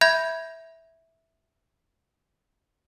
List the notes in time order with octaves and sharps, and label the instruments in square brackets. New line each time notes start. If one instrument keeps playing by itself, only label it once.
[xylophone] E5 B5 G6 G#6